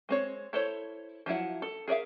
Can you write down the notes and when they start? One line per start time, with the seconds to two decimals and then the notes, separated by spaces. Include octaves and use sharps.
0.09 G#3 C4 C#5
0.53 E4 A4 C5 C#5
1.26 F3 F#3 E4 F#5
1.62 A4
1.88 G#4 A#4 D5 E5 F5